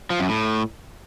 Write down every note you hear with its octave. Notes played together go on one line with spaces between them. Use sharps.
F3
F#2
A2